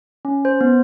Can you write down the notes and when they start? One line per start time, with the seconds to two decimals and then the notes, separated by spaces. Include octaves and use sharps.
0.25 C#4
0.45 C5
0.61 B3